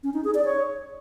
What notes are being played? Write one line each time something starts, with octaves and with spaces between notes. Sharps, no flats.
C#4
D#4
G#4
D5
C#5